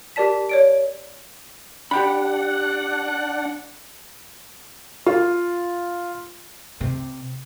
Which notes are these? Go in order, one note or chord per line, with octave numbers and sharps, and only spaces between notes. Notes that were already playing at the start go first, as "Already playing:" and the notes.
G4 A#4 D5 A5 B6
C#5 D5 D7
D4 G4 F#5 G5 B5
F4
C3